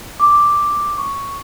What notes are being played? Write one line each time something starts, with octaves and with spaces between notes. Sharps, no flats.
D6
C#6